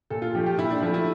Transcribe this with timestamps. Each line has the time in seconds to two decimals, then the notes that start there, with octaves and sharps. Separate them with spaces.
0.10 A#2 A4
0.22 F4
0.35 F3 A3 G4
0.46 G4
0.58 A#2 E4
0.71 D4
0.82 F3 E4
0.86 A3
0.94 E4